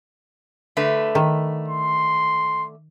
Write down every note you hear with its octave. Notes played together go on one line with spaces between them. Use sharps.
D3 A3 B4
D#3
C6